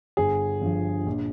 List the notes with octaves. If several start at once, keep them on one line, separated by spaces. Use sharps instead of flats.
G1 G#4
G2 F3
A#1